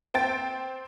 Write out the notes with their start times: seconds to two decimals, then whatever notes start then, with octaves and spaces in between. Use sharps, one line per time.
0.14 C4 G5 A6